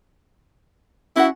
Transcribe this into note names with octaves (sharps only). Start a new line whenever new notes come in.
C#4 E4 F#4 F#5